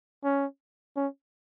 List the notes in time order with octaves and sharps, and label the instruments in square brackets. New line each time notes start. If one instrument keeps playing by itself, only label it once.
[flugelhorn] C#4
C#4